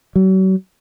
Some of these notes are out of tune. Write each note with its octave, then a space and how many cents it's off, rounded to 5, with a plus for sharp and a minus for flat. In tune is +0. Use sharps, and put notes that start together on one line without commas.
F#3 +40